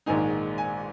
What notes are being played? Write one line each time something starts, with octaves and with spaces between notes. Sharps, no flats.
A#1 G#2 D#3 G#3 D#4 G#5
G#5